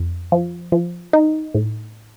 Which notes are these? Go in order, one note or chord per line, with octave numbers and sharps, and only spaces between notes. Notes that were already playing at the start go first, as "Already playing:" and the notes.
Already playing: F2
F3
F3
D#4
A2